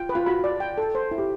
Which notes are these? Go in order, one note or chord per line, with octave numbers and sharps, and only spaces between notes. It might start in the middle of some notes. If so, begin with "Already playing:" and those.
Already playing: F4 G5
B4
F4
F#4 B5
D5
G5
A4
C5
E4
G4